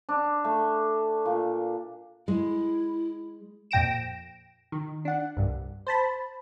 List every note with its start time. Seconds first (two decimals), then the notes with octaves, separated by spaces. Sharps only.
0.09 D4
0.44 A3
1.25 A#2
2.28 G#3 E4
3.71 F2 A#2 G5 A#6 D7 E7
4.72 D#3
5.05 D4 F#5
5.37 C2 G2
5.87 C5 A5 B5